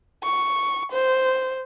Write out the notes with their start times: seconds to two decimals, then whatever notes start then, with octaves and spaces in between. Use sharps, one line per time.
0.23 C#6
0.92 C5